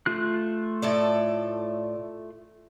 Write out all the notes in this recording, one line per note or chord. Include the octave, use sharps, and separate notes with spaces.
A3 F4 F#6
A2 A4 D5